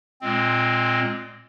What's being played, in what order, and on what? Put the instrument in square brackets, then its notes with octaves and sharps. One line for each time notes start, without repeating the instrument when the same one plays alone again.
[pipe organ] A#2 G#3 C4